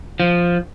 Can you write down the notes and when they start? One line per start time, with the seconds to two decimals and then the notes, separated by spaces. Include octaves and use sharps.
0.20 F3